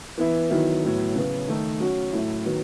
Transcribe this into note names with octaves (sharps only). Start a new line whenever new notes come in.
E3 B3 E4
D#3 F#3 B3 E4
A2 F#3 B3
C#3 F#3 B3
D#3 A3 D#4
F#3 C#4 F#4
A2 F#3 A3 E4
D#3 F#3 B3